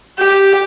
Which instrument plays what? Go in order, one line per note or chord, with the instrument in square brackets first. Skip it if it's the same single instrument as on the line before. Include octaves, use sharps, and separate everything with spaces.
[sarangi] G4